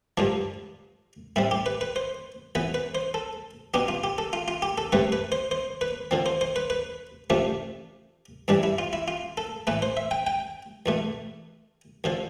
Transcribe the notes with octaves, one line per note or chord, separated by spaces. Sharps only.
G2 D3 F3 D4
A2 G3 C4 E4
G4
B4
B4
C5
F2 E3 B3 B4
B4
C5
A4
B2 B3 D4 G4
F4
G4
A4
F4
F4
G4
A4
G2 D3 A3 C4 B4
B4
C5
C5
B4
D3 F3 C4
C5
C5
B4
B4
F2 C3 F3 A3 D4
G2 E3 G3 D4
E4
F4
E4
F4
A4
A2 E3 A3 B4
C5
E5
G5
G5
E2 B2 A3
F2 D3 F3